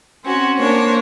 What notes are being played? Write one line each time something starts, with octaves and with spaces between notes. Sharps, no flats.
C4 C#4 F#4
A#3 D4 C5 C#5